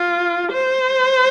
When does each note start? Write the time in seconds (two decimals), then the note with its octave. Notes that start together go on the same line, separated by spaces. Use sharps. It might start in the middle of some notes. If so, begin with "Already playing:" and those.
Already playing: F4
0.52 C5